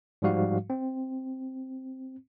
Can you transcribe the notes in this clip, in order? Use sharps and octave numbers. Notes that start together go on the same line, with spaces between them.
G#2 F3 G3 F#4 F5
C4